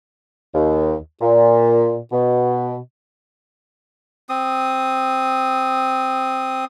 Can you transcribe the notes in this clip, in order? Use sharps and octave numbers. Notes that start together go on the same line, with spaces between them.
D#2
A#2
B2
C4 D#6